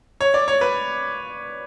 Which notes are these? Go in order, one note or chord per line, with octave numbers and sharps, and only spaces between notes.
C#5
D5
C#5
B4